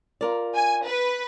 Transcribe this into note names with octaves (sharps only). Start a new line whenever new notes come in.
F4 A#4 D5
G#5
B4